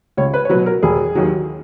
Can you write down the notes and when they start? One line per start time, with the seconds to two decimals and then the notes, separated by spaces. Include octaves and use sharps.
0.17 C#2 C#5
0.34 B4
0.45 C#5
0.50 F#3 B4
0.54 B2
0.66 A#4
0.83 E1 G#4
1.15 D#2 D#3 F#3